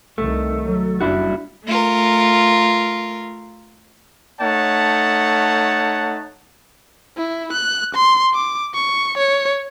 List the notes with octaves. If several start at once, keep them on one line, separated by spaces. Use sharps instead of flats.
C2 D#3 A3
F#3
F#1 G3 D4 E4 F#4
A3 F4 A#4
A3 D#4 C#5 F#5 A5
E4
F#6
C6
D6
C#6
C#5